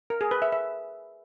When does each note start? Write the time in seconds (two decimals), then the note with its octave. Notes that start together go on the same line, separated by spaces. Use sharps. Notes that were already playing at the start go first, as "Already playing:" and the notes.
0.10 A#4
0.21 G#4
0.31 B4
0.42 E5
0.52 E5